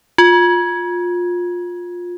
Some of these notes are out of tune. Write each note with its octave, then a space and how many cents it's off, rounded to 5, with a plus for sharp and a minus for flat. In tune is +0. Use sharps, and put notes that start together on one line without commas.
F4 +20